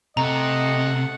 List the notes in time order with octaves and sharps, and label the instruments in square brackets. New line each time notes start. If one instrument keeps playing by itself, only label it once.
[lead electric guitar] C3 [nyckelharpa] A3 F#5 [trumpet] D#5 [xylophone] A#5